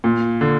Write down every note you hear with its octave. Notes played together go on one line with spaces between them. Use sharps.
A#2
D3